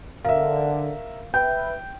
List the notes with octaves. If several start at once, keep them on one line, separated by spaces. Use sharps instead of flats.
D3 A#4 E5 F5
B4 E5 G5 G6